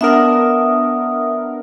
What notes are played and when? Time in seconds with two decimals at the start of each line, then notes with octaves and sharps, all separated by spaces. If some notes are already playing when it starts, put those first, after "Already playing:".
0.01 B3 D4 A#4 E5 F#5 D#6